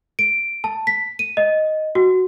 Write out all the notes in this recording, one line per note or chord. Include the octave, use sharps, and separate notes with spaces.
D7
A5
B6
D#7
D#5
F#4